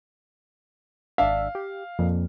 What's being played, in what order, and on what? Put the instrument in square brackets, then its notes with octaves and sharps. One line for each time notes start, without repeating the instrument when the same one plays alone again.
[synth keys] G#1 D4 E5 [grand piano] F5
[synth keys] G4
F2 A#2